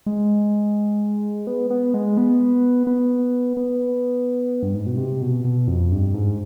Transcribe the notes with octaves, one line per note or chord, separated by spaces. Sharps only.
G#3
B3
B3
G#3
B3
B3
B3
G2
G#2
B2
C3
B2
B2
F2
G2
G#2